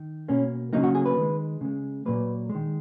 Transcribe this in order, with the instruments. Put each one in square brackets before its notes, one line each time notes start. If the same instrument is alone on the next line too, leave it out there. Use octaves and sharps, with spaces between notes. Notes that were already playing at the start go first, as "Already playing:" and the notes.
Already playing: [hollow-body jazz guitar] D#3
B2 A#3 C#4
C#3 F#3 A#3 D#4
F#4
G#4
B4
D#3 G#3
C#3 G#3
A#2 F#3 A#3 B4
G#3
D#3